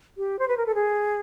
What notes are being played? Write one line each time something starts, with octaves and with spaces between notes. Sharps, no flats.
G4
C5
B4
A#4
A4
G#4